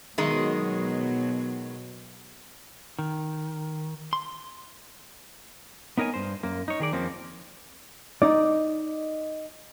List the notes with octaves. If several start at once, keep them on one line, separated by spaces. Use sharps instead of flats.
B2 D#3 F#3 G#3 D#4
D#3
C6
B3 D#4 A#4 C#5 G#5
G2 C5
F#2 A#3
D#4 C#5
D#3 G#4 D5
F2 F3 A#3 C4 C#4
D#4 D5